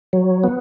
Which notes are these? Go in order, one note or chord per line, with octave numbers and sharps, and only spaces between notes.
F#3
B3